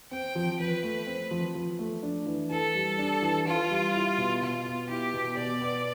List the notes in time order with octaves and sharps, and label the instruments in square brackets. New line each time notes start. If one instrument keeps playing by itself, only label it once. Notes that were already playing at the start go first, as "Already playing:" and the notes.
[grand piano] C4 [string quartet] G5
[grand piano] F3
[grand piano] F3 [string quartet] B4
[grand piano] A3
C4
F3
F3
A3
D4
E3
[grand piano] E3 [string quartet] A4
[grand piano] G3
D4
E3
[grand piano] E3 [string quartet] F4
[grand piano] G3
E4
B2
[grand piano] B2 [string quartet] F4
[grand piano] B3
[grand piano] E4 [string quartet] G4
[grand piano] B2
[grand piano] B2 [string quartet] D5
[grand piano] B3